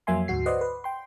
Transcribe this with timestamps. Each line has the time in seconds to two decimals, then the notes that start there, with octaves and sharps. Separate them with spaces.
0.07 F2 F#3 A#3 E5 G#5 C6
0.28 D2 G#2 F#4 C7
0.46 B4 C5 D5 D#5 F#5
0.61 B4
0.84 G5 C6